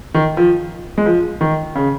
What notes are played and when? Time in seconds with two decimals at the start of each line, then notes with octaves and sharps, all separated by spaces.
0.14 D#3
0.37 F3
0.98 G#3
1.06 F3
1.41 D#3
1.76 C#3